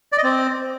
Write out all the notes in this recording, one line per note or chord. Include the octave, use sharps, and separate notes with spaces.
D5
D#5
C4